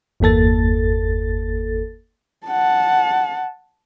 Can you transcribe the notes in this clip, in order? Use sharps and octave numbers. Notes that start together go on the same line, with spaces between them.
G1 E2 A#3 A4 A6
F#5 A5